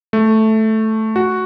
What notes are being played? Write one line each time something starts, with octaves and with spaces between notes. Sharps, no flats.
A3
F#4